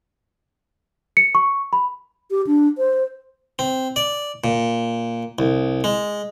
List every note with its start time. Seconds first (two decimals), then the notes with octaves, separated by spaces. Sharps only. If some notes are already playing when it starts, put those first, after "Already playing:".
1.17 C#7
1.35 C#6
1.73 B5
2.31 G4
2.47 D4
2.78 C5
3.59 C4
3.96 D5
4.44 A#2
5.39 C2
5.84 G#3